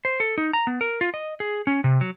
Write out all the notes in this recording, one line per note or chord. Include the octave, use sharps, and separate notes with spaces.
C5
A4
D#4
A#5
B3
A#4
F4
D#5
G#4
C#4
C3
F#3